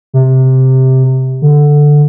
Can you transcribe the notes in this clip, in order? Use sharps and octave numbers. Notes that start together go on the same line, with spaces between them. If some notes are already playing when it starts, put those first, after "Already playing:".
C3
D3